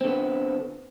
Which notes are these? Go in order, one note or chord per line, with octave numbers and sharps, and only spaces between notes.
D3 B3 C4